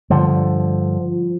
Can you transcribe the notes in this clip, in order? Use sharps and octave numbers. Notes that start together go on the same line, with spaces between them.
G2 D3 F3